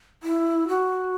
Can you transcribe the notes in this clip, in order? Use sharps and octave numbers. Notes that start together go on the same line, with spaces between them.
E4
F#4